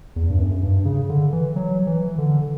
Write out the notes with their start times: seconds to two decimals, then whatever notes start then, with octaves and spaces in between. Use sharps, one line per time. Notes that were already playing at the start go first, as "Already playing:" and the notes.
0.16 E2
0.30 G2
0.39 F#2
0.63 G2
0.85 C#3
1.09 D3
1.33 E3
1.56 F#3
1.87 E3
2.18 D3